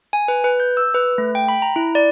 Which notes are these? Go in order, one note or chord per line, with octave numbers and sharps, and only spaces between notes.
G#5
B4
B4
G6
E6
B4
A3
G5
B5
A#5
E4
D5